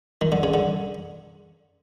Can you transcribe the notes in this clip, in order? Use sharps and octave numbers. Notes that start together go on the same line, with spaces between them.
D#3
D3
C#3
D3